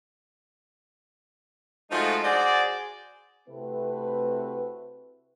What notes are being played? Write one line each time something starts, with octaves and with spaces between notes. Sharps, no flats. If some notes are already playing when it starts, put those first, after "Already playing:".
F3 G#3 A3 D#4 F4 F#4
F#4 G#4 C5 D5
C3 A3 C4 E4 F#4 B4